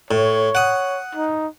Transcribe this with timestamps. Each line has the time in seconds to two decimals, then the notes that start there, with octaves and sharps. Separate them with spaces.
0.11 A2 C#5
0.55 F#5 D#6
1.15 D#4